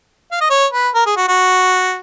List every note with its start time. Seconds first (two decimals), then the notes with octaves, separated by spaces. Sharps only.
0.32 F5
0.41 D#5
0.50 C#5
0.73 B4
0.95 A#4
1.06 G#4
1.17 F#4
1.28 F#4